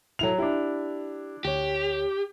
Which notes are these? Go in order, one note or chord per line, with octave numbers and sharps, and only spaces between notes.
A2 F#3 E4 A4 F7
D4 E4 G4
D2 G4 C#5